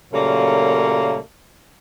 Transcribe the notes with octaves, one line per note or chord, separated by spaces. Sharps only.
A#2 C#3 F#3 G3 A3 A#3